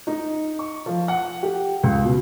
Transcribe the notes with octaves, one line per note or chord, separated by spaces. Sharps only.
D#4
C#6
F3
F#5
G4
C#2
B2